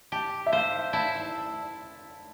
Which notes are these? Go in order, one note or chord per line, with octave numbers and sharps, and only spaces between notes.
G4 A5
E5
C5 F5
E4 A5